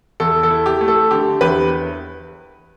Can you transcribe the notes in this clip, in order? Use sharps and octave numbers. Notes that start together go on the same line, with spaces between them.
E2 A4
A4
E4
G4
A3
A4
D3 G4
E2 G4 B4